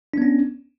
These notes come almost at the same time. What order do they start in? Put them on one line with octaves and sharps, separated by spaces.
D4 B3 C#4